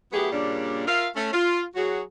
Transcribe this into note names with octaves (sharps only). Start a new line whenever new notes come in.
F#3 A3 B3 E4 G4 G#4
A#2 C#3 G3 A#3 D4
F4 A#4 E5 F5
A3 C#4
F4
F#3 F#4 G#4